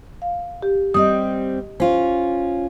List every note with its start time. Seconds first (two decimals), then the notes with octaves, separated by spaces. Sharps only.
0.22 F5
0.62 G4
0.94 G3 C4 D#5 D#6
1.80 C#4 F4 C5